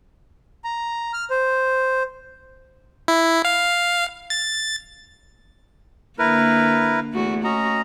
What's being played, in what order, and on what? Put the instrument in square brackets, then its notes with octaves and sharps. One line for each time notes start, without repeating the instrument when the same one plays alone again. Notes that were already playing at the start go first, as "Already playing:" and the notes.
[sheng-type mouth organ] A#5
F6
C5
[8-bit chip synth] E4
F5
A6
[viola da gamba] D3 A#3 [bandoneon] E4 A#4 B4
[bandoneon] E2 [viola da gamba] A3 F#4
[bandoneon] C#4 D#5 A#5 [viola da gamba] F#4